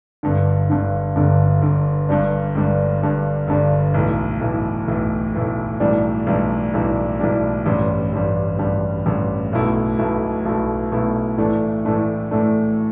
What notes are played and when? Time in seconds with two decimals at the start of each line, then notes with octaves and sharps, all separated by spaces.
0.23 G1 G2 D3
0.70 G1 G2 D3
1.16 G1 G2 D3
1.62 G1 G2 D3
2.09 G1 G2 G3 D4
2.55 G1 G2 G3 D4
3.02 G1 G2 G3 D4
3.48 G1 G2 G3 D4
3.94 B1 A2 E3
4.40 B1 A2 E3
4.88 B1 A2 E3
5.34 B1 A2 E3
5.80 B1 A2 E3 G3 D4
6.27 B1 A2 E3 G3 D4
6.74 B1 A2 E3 G3 D4
7.20 B1 A2 E3 G3 D4
7.66 A1 G2 G3
8.13 A1 G2 G3
8.59 A1 G2 G3
9.06 A1 G2 G3
9.53 B1 B2 A3 E4
9.99 B1 B2 A3 E4
10.45 B1 B2 A3 E4
10.92 B1 B2 A3 E4
11.38 A2 E3 A3 D4
11.85 A2 E3 A3 D4
12.31 A2 E3 A3 D4